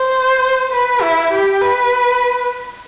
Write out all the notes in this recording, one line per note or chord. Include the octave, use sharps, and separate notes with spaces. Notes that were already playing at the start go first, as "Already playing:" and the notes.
Already playing: C5
B4
E4
G4
B4